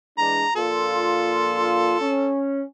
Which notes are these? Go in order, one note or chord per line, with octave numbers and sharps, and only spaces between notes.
E3 G#3 D4 A#5
A#1 A#2 F4 A4
C#4